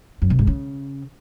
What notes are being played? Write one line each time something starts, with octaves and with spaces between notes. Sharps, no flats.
F#2
C3
G#2
C#3